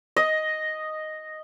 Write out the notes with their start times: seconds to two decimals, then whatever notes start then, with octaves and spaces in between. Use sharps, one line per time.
0.16 D#5